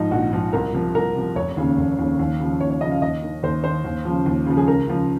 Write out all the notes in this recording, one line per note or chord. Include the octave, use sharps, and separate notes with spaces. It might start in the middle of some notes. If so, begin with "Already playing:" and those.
Already playing: G#2 F3 D#4
A#1 F#4
G#2 F3
C2 A#4
C3 F3
C2 A#4
C3 F3
F1 C#5
D#2 C#3
F1
D#2 C#3
D#2
C#3 F3
D#2 C#5
C#5
C#3 F3 D#5
F5
D#2 D#5
D#3
D#2 C5
D#3 C5
D#2
C#3 F3
D#2
C#3 F3
G#4
C#2 A#4
C#3 F3